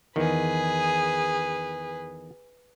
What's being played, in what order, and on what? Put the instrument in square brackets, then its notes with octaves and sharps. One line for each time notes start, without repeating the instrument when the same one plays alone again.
[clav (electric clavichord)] E2 D#3 [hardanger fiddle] G#4 B4